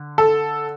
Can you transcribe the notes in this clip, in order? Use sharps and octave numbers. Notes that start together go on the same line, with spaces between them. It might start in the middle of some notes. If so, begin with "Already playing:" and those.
Already playing: D3
A4